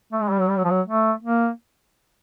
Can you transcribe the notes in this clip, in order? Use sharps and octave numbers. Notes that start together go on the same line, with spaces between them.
A3
G#3
G3
F#3
G3
F#3
F3
F#3
A3
A#3